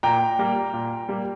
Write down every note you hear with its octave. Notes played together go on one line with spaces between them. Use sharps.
A#2 G5 A#5
G3 A#3
A#2
G3 A#3